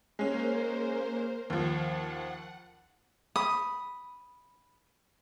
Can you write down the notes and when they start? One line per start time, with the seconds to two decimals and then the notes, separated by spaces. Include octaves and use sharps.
0.19 G#3 A#3 C#4 A#4 C5
1.50 D#2 F3 F#5
3.36 B5 D#6